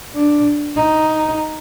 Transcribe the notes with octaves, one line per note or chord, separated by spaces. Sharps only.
D4
D#4